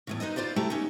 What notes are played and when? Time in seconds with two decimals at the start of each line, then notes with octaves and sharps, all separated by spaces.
0.07 E2 A2 C#3
0.20 D#4 B4 C5 D#5
0.36 E4 F4 C5 D5 E5
0.56 C3 A3 E4 G4 A#5
0.70 B3 C#4 D#4